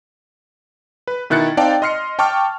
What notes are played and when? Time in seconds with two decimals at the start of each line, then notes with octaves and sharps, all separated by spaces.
1.08 B4
1.30 B2 D#3 E4 F#6 A6 C#7
1.57 C4 D#4 D5 F5 G5 A5
1.82 D#5 C6 F6 C7 C#7
2.19 G5 A5 C#6 D6 F6